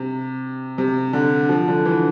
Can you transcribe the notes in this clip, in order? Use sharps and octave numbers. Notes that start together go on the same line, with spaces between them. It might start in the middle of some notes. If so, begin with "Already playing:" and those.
Already playing: C3
C3
D3
F3
D3
E3